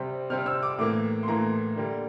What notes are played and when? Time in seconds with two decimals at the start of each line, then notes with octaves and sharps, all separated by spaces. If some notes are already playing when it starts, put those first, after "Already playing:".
Already playing: C3 G3 C4
0.30 C3 G3 C4 F6
0.46 E6
0.62 D6
0.79 A2 E3 A#3 D6
1.23 C6
1.28 A2 E3 A#3 A#5
1.76 D3 G3 A#3